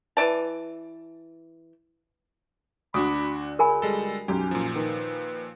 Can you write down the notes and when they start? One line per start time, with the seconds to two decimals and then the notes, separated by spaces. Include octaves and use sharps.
0.17 E3 D5 A5
2.94 D2 D4 F#4 B5 D6 D#6
3.59 G#4 A#4 G#5 B5
3.82 G3 G#3 A4
4.28 B1 F#2 C#4 G4
4.51 A#2 F3
4.75 D#3 B4